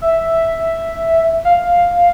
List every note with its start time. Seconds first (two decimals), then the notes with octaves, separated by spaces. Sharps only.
0.02 E5
1.45 F5